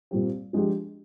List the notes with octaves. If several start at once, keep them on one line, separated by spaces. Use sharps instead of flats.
A#2 G3 C4 G4
F3 G#3 D4 G4